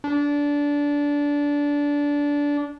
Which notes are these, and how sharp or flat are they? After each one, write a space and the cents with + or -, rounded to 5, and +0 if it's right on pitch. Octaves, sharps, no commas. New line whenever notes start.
D4 -20